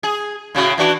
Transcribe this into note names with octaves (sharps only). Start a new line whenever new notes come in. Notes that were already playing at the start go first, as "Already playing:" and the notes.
G#4
A2 C#3 F#4
E3 D4 F#4